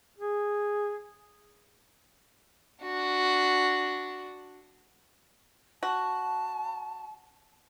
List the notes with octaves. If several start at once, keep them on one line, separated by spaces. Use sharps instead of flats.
G#4
D4 F#4
F#4 A5